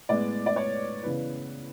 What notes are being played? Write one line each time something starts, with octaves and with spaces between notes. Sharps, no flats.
A2 G#3 B3 D5
D5
C#5
C#3 E3 B3 B4